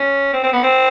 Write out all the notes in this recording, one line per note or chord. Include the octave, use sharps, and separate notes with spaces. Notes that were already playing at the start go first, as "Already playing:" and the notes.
Already playing: C#4
C4
C4
B3
C4